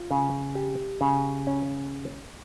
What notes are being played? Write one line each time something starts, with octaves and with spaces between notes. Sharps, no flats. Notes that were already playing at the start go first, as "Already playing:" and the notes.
Already playing: F4
C#3
G4
C#3
C#4